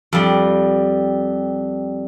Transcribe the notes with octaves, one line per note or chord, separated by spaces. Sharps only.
F2 G3